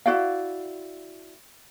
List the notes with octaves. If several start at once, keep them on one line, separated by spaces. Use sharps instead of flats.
E4 F#4 D5 F5